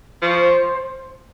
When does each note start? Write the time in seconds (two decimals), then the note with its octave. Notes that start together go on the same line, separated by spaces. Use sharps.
0.22 F3 C#6
0.39 C5